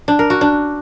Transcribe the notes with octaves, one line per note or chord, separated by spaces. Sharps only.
D4
A#4
F#4
D4